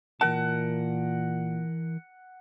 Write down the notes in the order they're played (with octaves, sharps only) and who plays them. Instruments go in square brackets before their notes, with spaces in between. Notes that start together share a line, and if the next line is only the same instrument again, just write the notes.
[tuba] A#2 [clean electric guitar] E3 A#4 A5 [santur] F#5